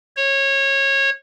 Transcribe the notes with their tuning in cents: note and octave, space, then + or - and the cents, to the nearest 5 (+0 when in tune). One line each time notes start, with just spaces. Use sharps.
C#5 -20